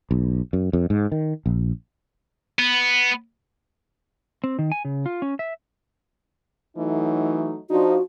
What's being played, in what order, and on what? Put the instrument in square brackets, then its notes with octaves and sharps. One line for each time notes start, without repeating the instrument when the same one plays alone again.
[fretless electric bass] B1
F#2
F2
G#2
D#3
A#1
[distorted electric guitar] B3
[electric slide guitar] C4
D#3
G#5
C#3
F4
C#4
E5
[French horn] E3 [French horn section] F#3 A3 D#4
[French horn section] F3 D4 [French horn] D#4 [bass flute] F#4